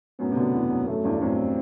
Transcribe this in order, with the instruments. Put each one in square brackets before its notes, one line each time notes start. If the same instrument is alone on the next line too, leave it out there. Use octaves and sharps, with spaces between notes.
[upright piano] F#2 A2 [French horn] B3
[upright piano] C3
B2 D3
E2
F#2
[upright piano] F#2 [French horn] A3
[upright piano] E2 G2
[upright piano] F#2 A2 [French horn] C4